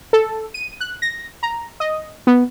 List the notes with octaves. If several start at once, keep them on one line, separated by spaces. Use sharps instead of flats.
A4
D#7
F#6
A#6
A#5
D#5
B3